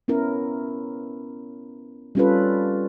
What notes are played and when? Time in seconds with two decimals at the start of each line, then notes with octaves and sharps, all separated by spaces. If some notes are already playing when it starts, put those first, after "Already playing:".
0.08 B3 C#4 E4 A#4
2.15 G3 C4 C#4 F4 A4 B4